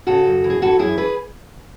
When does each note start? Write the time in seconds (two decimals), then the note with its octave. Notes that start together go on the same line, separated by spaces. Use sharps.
0.07 C#3 F#4 A4
0.25 F#2
0.44 E3
0.50 G#4
0.62 E3 F#4 A4
0.79 F#2 E4 G#4
0.97 G#4 B4